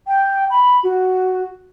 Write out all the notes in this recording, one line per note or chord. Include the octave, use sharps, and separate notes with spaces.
G5
B5
F#4